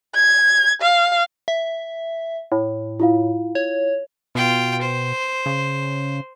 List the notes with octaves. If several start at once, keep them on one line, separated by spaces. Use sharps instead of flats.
G#6
F5
E5
A2
E4 F4 F5
C#5
B2 F4 G5
C5
C#3